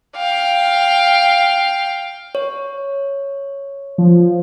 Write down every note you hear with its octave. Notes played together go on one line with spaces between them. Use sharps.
F5 G5
C#5
F3